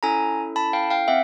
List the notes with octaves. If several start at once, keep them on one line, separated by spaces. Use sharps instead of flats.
C#4 E4 A4 G#5 A#5
A5 B5
F5 G5
F5 G5
C4 E5 F#5